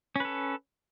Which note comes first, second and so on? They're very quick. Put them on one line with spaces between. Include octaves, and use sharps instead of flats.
C#4 B4 A4